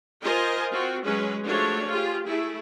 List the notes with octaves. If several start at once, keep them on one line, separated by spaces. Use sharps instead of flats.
F4 A#4 C5 D#5 G#5
C4 F4 F#4
F#3 G#3 C#4 G#4 B4
F3 A3 D4 F#4 G#4 C#5
F4 G4 G#4
A3 E4 G#4